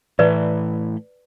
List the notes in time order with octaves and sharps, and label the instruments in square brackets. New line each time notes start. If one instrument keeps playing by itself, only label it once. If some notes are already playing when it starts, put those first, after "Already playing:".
[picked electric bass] A2 E3 A3 [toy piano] B4 D5